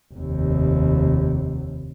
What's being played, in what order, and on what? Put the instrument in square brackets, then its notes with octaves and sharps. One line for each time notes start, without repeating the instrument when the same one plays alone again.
[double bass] F1 D#2